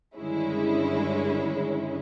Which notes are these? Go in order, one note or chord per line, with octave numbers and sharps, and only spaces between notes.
G2 D3 D#3 G#3 C#4 E4